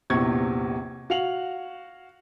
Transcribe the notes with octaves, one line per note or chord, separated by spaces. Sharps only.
A#1 E2 C3 C#6 G#6
F#4 F5 F7 F#7